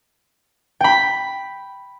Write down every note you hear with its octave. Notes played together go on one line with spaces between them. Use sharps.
G5 B5